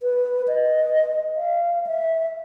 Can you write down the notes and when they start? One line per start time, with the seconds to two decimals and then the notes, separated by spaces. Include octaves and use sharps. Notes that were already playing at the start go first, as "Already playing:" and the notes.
0.03 B4
0.48 D#5
1.36 F5
1.87 E5